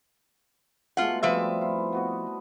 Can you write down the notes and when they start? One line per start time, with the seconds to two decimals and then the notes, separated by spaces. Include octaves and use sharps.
0.97 B2 G#3 A3 F4 F#5
1.23 F3 G3 C4 B4 E5
1.61 E4 F4
1.92 B3 F#4 D#5